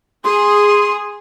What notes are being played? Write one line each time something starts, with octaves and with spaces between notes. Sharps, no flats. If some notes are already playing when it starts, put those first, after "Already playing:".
G#4 C6